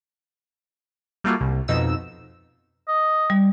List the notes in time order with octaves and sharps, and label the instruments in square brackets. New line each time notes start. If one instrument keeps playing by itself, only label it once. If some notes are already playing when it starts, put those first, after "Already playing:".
[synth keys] G3 A3 A#3 F4 F#4
C2
F2 B2 D#4 E6 E7
[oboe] D#5
[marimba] G3